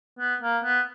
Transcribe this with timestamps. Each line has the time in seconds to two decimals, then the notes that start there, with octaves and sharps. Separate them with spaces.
0.19 B3
0.42 A#3
0.64 B3